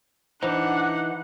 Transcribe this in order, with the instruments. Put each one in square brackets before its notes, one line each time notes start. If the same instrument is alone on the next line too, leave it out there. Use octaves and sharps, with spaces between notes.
[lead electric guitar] E3 D#4 [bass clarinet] D4 [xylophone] C5 [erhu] F#5